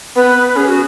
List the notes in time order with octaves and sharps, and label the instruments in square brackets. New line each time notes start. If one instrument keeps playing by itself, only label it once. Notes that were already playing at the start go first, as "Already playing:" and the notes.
[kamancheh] B3 [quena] B4
[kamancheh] C#4 [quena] G#4
[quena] F#4